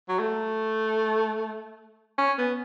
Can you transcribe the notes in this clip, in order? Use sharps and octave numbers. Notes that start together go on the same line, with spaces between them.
F#3
A3
C#4
B3